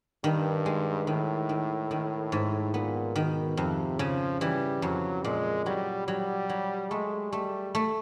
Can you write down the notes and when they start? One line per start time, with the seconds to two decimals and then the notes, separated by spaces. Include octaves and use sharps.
0.24 G2 D#3
0.66 G#3
1.07 A2 D#3
1.49 D#3
1.91 D#3
2.32 G#2
2.74 A#2 B3
3.16 B2 D#3
3.57 F2 C3
3.99 C#3 F3
4.41 E3 G3
4.82 F2 F#3
5.24 A#2 G#3
5.65 F#3 G3
6.08 F#3 G3
6.49 F#3
6.91 G#3 A3
7.32 G3 A3
7.75 A3